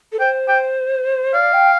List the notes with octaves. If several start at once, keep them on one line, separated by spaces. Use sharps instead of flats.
A4
C5 G5
G5
D5 F5
G5